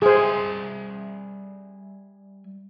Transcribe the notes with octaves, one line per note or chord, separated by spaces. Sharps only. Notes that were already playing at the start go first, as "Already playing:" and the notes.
G3 G#4 C5 E5 G#5